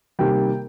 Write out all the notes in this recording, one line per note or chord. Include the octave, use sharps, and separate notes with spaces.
C3 D#3 G3 A#3 G5